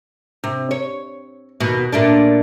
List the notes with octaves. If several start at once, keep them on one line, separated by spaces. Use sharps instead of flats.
C3
C#5
D#2 B2
A#2 A3 D4